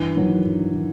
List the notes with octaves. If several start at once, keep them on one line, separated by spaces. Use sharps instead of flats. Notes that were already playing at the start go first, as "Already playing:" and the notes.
Already playing: G2 E3
D#3 F#3
G2
D#3